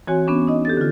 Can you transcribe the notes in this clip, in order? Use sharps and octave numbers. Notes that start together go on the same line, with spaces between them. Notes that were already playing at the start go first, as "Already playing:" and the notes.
E3 C4 F#4 C#5 G#5
B3 C#4 D4
D#4 D#5
G4 A4 A6
D3 F4